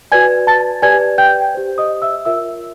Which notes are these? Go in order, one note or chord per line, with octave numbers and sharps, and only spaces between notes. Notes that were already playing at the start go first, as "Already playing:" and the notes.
F#4 B4 D5 G#5 G#6
A5 A6
G4 B4 D5 G#5 G#6
G5 G6
G4 C5
D#5 D#6
E5 E6
F4 A#4 C#5 E5 E6